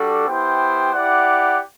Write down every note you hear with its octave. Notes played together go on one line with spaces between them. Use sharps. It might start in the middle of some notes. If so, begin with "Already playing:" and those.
Already playing: G3 D4 F#4 A4
B3 E4 G4 C5 G5
E4 G4 D5 F#5